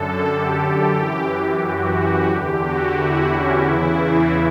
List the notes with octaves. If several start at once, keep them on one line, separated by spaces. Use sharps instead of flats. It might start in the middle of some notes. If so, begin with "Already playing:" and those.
Already playing: F#2 D3 A4
G4
G4
F#2 E3
F#4
F#4
E2 D3 G4
F#4
E4
C#4
E2 C#3 E3 E4